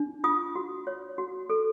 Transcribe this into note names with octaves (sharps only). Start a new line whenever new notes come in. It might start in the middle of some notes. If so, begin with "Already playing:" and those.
Already playing: D4
F4 D#6
F#4
C#5
F#4
A4